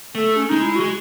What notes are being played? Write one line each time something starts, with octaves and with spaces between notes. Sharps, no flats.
A3 A4
C#4
G#3 D#4
E4
G#3 F#4